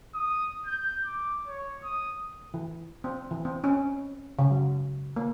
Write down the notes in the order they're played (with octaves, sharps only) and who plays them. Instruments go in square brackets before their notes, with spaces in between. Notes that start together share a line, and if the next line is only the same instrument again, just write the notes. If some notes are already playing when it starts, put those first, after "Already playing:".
[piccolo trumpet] D#6
G6
D6
C#5
D#6
[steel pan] E3
C4
E3
C4
C#4
C#3
F#3
A#3